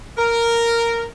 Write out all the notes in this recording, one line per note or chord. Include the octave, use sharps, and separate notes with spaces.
A#4